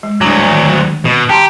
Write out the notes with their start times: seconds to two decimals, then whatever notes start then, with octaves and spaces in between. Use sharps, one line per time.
0.03 G#3
0.21 D2 F#3 G3 D4 D6
0.49 D#3
1.05 B2 D#5
1.29 G4 A5 A#5 C6